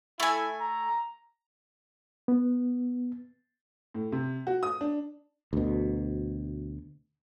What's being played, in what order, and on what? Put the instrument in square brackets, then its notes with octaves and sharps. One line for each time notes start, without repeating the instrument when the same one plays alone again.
[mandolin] A3 G#5 [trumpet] E4
[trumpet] A#5
[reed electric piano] B3
[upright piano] A2
C3
F#4
D#6
D4
[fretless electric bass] D2 B2